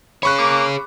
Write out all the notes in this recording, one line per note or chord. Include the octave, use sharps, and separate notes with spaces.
G#4 C#5 B5 C#6 F#6
A#3 D6